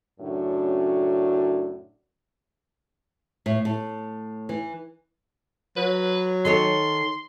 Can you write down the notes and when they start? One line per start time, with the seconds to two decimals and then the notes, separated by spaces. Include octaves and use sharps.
0.20 F#2 A2 C#3 D4 F#4
3.46 A2
3.65 A2
4.49 E3
5.77 F#3 B4
6.45 D#3 A4 C#5 C6